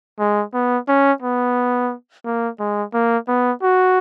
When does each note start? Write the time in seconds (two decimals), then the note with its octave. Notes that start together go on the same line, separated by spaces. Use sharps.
0.19 G#3
0.54 B3
0.88 C#4
1.22 B3
2.25 A#3
2.59 G#3
2.94 A#3
3.28 B3
3.62 F#4